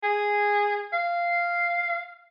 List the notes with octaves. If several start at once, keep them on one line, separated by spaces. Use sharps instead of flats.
G#4
F5